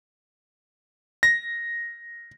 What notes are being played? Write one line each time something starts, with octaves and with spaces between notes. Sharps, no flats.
A#6